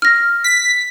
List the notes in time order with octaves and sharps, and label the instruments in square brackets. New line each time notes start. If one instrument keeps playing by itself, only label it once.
[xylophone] F6 A#6
[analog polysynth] B6